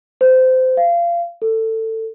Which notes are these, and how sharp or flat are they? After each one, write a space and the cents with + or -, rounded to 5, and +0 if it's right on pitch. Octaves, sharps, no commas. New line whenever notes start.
C5 -20
F5 -25
A4 +20